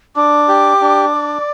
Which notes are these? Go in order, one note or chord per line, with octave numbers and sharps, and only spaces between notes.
D4 D6
G4
D4
D5